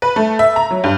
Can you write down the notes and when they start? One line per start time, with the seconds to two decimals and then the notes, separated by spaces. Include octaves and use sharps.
0.02 B4
0.16 A3
0.39 E5
0.56 A#5
0.71 F#3
0.84 G2